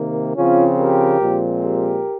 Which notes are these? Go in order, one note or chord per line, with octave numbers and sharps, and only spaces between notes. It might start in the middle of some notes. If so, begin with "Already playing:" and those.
Already playing: C3 D#3 A#3
C#3 F3 C4 C#4 F4
G4 A#4
A#2 F3 G#3 C4
G4 A#4